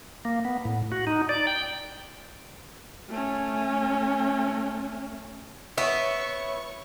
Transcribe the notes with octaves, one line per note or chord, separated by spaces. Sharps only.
A#3
B3
A2
F#4
D#4
D5
G5
A3 C#4
B3 E4 C#5 C#6